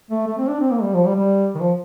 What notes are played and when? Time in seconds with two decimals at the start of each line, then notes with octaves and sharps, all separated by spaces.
0.11 A3
0.27 A3
0.38 C4
0.49 D4
0.60 C4
0.71 A#3
0.83 G3
0.94 F3
1.05 G3
1.16 G3
1.55 D#3
1.60 F3